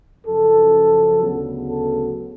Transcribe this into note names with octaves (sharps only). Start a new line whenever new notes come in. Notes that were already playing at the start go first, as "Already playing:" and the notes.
F#2 C#3 F3 A4
D2 C#3 F#3 B3
A4